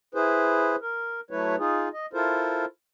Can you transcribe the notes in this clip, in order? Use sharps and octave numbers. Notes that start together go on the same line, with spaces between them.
E4 G#4 B4 C5
A#4
F#3 A3 E4 B4 C#5
D#4 F4 G#4
D#5
E4 F4 A4 A#4 C5